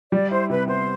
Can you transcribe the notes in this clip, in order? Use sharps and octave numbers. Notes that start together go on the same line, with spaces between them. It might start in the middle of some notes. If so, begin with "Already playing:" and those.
G3 D5
E4 C5
C3 B4
B3 C5